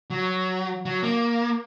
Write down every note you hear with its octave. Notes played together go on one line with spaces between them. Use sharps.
F#3
F#3
A#3